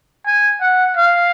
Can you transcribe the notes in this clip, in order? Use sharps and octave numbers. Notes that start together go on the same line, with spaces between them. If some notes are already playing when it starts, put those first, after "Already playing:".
G#5
F#5
F5